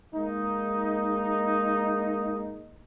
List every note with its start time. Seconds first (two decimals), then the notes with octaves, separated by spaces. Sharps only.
0.14 G#3 A#3 D#4